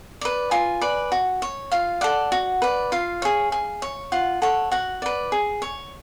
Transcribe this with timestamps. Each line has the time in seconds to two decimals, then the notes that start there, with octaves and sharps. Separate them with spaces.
0.21 B4 D5
0.51 F4 G#5
0.81 B4 D5
1.12 F#4
1.42 C#5
1.72 F4 F5
2.01 A4 D5 F#5
2.32 F#4
2.62 B4 D5
2.92 F4 F5
3.22 G#4 C#5
3.52 G#4
3.82 C#5
4.12 F4 F#5
4.42 A4 C#5 F#5
4.72 F#4 F#5
5.02 B4 D5
5.32 G#4
5.62 C#5